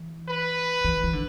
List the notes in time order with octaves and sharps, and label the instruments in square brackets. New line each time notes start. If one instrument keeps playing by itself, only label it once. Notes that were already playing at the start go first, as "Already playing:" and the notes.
Already playing: [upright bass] E3
[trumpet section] B4
[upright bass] E3
E3
D3